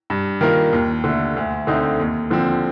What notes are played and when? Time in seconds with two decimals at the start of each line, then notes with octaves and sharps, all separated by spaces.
0.10 G2
0.41 D#3 A#3 F4 A#4
0.73 D#2
1.04 D3 A3
1.36 D2
1.67 D3 A3 C4 D#4
2.00 D#2
2.31 D3 F3 C4